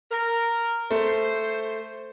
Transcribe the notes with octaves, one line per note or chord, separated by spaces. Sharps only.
A#4
A3 C5